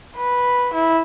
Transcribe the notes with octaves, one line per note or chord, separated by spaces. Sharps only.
B4
E4